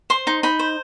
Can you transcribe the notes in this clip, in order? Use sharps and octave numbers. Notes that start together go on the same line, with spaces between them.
C5 C6
D#4
D#4 B5
C5